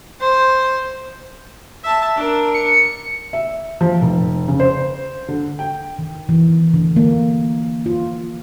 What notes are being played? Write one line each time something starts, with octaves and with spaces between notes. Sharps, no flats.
C5
E5 A5
D4 A#4
C#7
E5
F3
F1
C#3
C5
D3
G5
D#3
E3
D3
A#3
F4